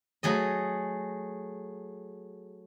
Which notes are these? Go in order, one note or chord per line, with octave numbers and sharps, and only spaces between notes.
F#3 A3 G#4 D#5